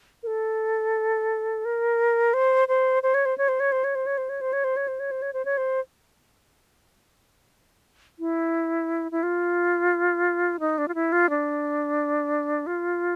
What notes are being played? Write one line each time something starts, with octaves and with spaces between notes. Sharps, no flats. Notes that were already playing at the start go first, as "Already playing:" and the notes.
A#4
A4
A#4
C5
C5
C5
C#5
C5
C#5
C5
C#5
C5
C#5
C5
C#5
C5
C#5
C5
C#5
C5
C#5
C5
C#5
C5
C#5
C5
C#5
C5
E4
E4
F4
D#4
D4
F4
E4
F4
D4
F4